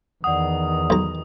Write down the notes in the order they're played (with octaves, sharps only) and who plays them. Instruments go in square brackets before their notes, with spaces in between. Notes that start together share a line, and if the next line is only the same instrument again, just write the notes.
[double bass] E2 D#3 [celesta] D5 F#5 [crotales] D#6
[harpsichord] B1 A#5